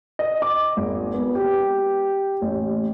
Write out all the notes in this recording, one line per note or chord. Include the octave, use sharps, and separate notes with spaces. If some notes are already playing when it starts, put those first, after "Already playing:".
D#5
D6
G#1
B3
G4
A1